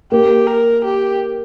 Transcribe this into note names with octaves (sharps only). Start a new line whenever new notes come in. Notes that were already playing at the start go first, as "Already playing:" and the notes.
A#3 G4
A#4
G4